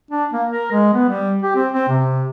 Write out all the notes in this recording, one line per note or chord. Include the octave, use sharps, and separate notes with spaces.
D4
A#3
A#4
G#3
B3
G3
G4
C4
C4
C3